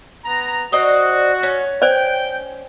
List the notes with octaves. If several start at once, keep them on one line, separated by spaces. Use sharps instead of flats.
B3 A#5
F#4 C5 D5 D#5
C#4
C5 D5 G5